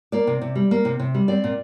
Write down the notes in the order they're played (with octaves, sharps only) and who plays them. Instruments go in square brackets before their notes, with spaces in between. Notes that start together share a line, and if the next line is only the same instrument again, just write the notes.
[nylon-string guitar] A#3 D5
C3
C3
G3
A#3
C3
C3
G3
C4 D5
A#2